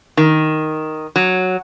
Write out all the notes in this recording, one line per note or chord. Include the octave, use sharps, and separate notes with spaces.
D#3
F#3